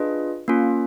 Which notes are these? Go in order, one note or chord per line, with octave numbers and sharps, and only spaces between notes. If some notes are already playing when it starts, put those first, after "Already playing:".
Already playing: D4 F4 G#4 B4 D#5
A#3 C#4 F4